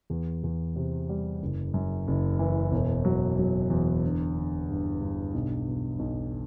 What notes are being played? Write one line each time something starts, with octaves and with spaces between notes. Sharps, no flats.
E2
E2
C3
G3
F#1
F#2
F#1
E3
E1
F#3
F#3
E2
D3
D3
G2
G2
B1
B2
B1